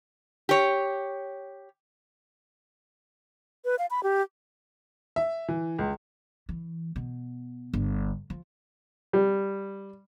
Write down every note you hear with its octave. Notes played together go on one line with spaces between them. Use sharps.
G4 C#5
B4
F5
B5
G4
E5
E3
C#2
E3
B2
G1
F3
G3